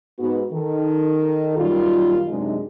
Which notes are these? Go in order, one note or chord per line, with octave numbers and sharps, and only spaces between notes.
G#2 B3 F#4
D#3 A4
F#2 A#2 D#3 G3 F4
F#2 C3 G#3 D4 D#4